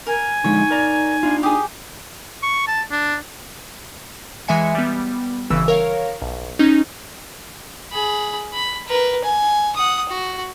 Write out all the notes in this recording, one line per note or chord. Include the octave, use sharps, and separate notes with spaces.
A#4 G#5
D3 F3 G#3 D#4 C#5
A#4 D5 A#5
D4 F4
G4 G#4 D#6
C#6
A5
D4
E3 G#3 E5 G#5 C#7
G3 B3
G1 C#3 E3 E6
A#4 C#5 F5
B1
C#4 D#4
G#4 B5
B5
A#4 B4
G#5
F#5 D#6
F#4